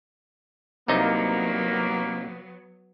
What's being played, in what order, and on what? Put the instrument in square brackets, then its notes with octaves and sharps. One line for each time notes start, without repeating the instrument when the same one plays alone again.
[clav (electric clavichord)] C2 C3 D#4 [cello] F#3 B3 [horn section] A#3